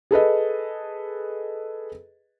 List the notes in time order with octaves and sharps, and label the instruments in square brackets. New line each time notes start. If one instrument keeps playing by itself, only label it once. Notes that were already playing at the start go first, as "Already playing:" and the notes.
[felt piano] G#4 A4 B4 D#5